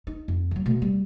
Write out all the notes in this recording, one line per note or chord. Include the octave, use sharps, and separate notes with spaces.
D#4
F2
D#3 F#3
B2 A3
G3